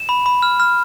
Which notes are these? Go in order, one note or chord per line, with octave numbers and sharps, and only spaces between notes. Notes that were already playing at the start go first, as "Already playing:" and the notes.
Already playing: E7
B5
B5
F6
F6